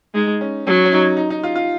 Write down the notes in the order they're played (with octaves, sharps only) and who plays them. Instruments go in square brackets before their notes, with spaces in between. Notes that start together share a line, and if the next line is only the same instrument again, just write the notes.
[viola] G#3 [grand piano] D#4
[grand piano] C#4
[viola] F#3 [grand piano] C#4
[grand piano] C#4
D#4
D#4
D#4
F4
F4